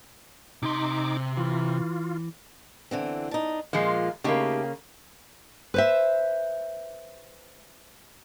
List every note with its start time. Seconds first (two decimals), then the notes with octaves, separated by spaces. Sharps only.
0.63 C3 D#4 C6 D6
1.37 E3 F4
2.91 D3 E3 C4
3.31 D4 D#4
3.73 A#2 F3 G#3 F5
4.24 C#3 A3 A#3 D#4 G4
5.74 B4 C5 E5